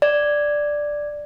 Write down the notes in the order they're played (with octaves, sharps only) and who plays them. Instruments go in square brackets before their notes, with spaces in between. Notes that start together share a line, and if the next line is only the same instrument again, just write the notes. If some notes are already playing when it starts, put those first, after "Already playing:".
[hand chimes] D5